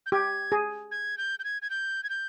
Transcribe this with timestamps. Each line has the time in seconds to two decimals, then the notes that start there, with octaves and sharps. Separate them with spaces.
0.06 G6
0.12 G4 G#6
0.52 G#4
0.91 G#6
1.18 G6
1.39 G6
1.44 G#6
1.62 G#6
1.70 G6
2.04 G#6
2.10 G6